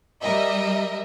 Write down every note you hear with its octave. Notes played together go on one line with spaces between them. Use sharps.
G3 A#4 D#5 E5